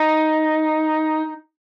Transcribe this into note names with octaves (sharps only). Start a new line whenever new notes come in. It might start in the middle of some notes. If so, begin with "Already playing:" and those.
Already playing: D#4